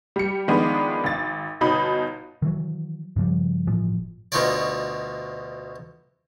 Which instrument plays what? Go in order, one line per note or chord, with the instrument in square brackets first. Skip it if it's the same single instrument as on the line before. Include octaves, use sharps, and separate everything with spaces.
[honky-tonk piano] G3 C#7
D#3 F3 G#3 B3 D4
G#1 A6
G1 B2 D#4 B5
[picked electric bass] D#3 E3 F#3
G2 C#3 F3 G3
G1 A2 E3 F3
[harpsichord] D2 B2 D#4 F4 C#5 D5